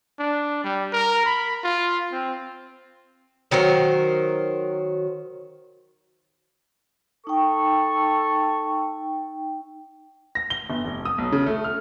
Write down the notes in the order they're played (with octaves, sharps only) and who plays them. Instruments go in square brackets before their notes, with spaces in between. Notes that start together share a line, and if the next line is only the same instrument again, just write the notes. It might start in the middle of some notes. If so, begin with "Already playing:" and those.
[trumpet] D4
G3
A#4
B5
F4
C4
[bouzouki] D#3 F#3 A#4 C5
[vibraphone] D#4 G5 [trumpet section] A4 C#6
[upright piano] A#6
G7
G1
F1
D#6
B1
C#3
A3
F6